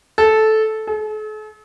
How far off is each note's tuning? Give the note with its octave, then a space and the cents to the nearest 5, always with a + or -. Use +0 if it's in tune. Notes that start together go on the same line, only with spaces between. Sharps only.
A4 -10
A4 -45